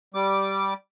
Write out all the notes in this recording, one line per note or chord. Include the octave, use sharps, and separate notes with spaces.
G3 D6